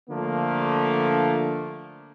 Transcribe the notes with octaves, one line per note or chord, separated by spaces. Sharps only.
D3 F3 A3 A#3 D4